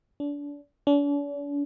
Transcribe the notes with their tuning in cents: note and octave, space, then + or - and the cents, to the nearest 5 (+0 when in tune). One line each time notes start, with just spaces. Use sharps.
D4 -30
D4 -45